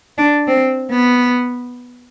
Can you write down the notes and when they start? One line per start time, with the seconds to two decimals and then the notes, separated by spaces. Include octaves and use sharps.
0.18 D4
0.47 C4
0.91 B3